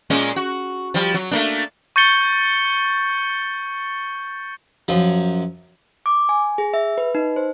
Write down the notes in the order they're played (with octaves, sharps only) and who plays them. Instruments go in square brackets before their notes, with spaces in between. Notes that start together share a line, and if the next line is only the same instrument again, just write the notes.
[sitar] A#2 G#3 C#4
F#4
F3 G3
F#3
A3 A#3 D4
[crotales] C#6 G6 A6 C#7 G7
[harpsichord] F#2 F3
[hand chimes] D6
G#5
G#4
E5
B4
D#4
C5